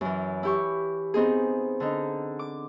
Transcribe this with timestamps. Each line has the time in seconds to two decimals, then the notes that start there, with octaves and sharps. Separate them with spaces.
0.01 F#2 E3
0.43 E4 G4 C#6
1.14 B3 C4 D#4 G#4
1.80 D3 D#4
2.39 D6